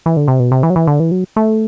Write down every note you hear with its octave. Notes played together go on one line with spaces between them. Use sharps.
E3
D3
C3
B2
C3
E3
F#3
E3
D3
E3
F#3
A3